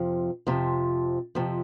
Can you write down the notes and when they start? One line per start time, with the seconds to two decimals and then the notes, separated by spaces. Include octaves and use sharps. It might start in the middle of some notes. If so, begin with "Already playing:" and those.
Already playing: F2 C3 F3
0.47 F2 C3 F3
1.35 F2 C3 F3